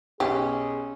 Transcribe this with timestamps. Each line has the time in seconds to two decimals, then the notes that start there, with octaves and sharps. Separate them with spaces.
0.20 B1 C#4 G4 G#4